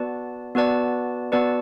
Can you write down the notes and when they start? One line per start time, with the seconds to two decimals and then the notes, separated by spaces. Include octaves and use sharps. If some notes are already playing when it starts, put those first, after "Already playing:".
Already playing: B3 F#4 B4 D5 A5
0.55 B3 F#4 B4 D5 A5
1.32 B3 F#4 B4 D5 A5